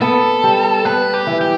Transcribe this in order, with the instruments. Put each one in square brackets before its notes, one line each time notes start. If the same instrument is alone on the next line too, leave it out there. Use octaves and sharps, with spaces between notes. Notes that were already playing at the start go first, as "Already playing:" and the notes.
[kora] B3 [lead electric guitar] A4
[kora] G3
[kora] B3 [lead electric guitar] B4
[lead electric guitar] G4
[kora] E3
[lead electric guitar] G4